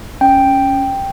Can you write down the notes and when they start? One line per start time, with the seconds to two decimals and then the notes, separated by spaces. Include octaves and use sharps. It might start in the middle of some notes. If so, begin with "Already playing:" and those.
0.21 C#4 G5
0.46 C#4